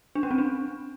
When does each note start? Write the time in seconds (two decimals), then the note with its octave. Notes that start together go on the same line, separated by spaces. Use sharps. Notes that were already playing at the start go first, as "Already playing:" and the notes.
0.15 D4
0.23 C#4
0.31 C4
0.38 D4